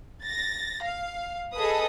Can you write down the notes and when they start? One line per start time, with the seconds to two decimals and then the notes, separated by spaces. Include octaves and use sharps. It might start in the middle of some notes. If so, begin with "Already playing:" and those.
0.22 A6 A#6
0.83 F5
1.54 G#4 A4 B4 D#5 D#6